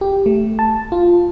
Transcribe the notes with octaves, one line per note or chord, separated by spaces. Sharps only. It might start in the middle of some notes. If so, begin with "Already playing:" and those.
G4
A3
A5
F4